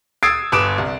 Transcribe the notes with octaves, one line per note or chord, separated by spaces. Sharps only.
D#6 E6 G#6 A6 C7 D7
G1 B4 D6 D#6 D7 E7
C2